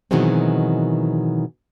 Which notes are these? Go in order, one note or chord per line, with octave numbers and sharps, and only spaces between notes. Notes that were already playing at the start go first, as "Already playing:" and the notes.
B2 D#3 E3 F#3 G#3 C4